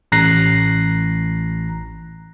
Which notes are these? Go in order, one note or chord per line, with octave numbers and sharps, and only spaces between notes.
A1 A#5 F#6 A#6 C7